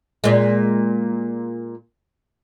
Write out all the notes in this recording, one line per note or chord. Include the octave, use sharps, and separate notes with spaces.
A#2 G#3